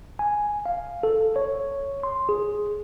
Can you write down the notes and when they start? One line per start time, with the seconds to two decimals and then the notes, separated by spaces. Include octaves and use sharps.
0.19 G#5
0.66 F5
1.03 A4
1.36 C#5
2.03 C6
2.29 G#4